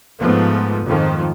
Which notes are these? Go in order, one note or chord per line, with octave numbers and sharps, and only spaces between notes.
G#2 F3 A3 B3
F2 G#2 D#3 F3